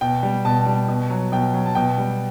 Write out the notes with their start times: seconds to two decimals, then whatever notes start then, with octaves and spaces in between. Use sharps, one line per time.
0.01 B2 G5
0.23 G3
0.45 B2 A5
0.66 G3
0.88 B2
1.10 F#3
1.32 B2 G5
1.54 F#3
1.66 A5
1.75 B2 G5
1.98 G3